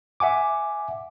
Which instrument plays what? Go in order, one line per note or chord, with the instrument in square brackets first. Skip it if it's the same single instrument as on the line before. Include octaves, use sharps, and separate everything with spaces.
[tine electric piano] E5 F#5 G#5 D6